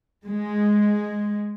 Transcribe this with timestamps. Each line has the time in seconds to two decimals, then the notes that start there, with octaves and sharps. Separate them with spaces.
0.25 G#3